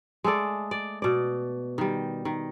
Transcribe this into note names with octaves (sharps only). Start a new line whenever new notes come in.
G#3 A3 A4 D5
D5
B2 D5
D#3 G3
D#3